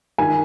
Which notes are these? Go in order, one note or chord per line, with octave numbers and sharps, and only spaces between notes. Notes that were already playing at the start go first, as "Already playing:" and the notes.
D#3 G#5